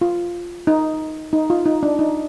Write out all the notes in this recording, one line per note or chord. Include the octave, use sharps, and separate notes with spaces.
F4
D#4
D#4
F4
D#4
D4
D#4